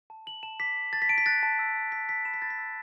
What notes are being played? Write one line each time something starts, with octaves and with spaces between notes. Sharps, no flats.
A5
A5 F#7
A5 E7
D6 B6
A5
A5 A6
B6
A5 D7
B6
F#6 A6
A5
E6
E6
E6 B6
E6 B6
B5 E7
B6
B5 A6
B6
E6